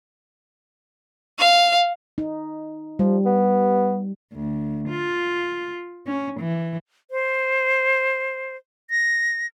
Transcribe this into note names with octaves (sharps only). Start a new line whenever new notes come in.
F5
D#4
F3 G3
B3
D2
F4
C#4
E3
C5
A#6